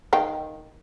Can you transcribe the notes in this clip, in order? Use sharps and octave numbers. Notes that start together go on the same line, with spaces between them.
D#3 F5 G5